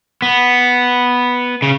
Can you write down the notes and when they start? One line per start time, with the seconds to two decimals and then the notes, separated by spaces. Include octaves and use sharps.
0.22 B3
1.62 C#3